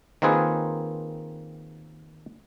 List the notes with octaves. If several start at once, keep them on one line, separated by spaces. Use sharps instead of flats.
D#3 A#3 C4 F4 G#4 B4